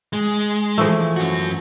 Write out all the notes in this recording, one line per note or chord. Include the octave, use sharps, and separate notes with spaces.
G#3
E3 F3 A3
F#2 F#4